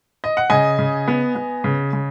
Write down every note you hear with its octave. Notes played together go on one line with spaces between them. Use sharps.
D#5
F#5
C#3 D#5 G#5
C#3
B3
B3
C#3
C#3